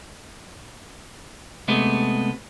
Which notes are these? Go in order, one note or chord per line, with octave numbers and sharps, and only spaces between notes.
C3 G#3 A3 B3